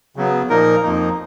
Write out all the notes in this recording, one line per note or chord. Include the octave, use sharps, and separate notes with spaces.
C#3 F#3 B3
A#2 F3 A#3 D#4 A#4
F2 F3 A#3 D#4